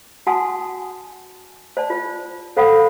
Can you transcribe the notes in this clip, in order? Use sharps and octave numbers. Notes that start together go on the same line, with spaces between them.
F#4 F#5 G#5 A5 C6 D#6
C5 D5 A5
F4 C5
A4 C5 F5 F#5 B5 D#6